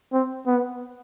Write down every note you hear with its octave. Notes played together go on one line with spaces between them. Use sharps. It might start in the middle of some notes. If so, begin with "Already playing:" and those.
C4
B3